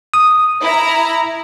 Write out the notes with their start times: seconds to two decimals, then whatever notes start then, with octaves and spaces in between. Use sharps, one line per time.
0.14 D#6
0.62 E4 A#5